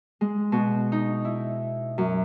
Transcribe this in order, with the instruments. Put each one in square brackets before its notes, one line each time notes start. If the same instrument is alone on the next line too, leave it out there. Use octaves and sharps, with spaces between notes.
[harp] G#3
B2
D#4
E4
F#2